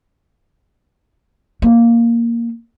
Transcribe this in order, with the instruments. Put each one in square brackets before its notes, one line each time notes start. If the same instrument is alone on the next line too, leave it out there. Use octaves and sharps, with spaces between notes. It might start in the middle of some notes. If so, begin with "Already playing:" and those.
[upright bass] A#3